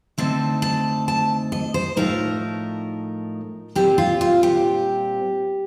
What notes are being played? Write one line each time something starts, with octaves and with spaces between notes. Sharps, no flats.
D3 A3 C4 D#4 A5
A5
A5
D#5
C5
A2 F3 A3 D#4 A#4
A#2 G3 C4 G4
F4
F4
G4